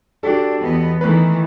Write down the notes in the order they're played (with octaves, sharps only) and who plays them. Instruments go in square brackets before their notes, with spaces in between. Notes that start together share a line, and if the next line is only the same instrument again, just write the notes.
[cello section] D4 [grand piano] F#4 G4 A4
[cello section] E2 B3 D#5
[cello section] D#3 E3 A3 [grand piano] B4 F#6